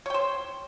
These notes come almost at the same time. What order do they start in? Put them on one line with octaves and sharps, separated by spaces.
C#5 G5 C5